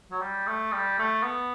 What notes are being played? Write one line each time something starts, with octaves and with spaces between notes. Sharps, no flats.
F#3
G3
A3
G3
A3
B3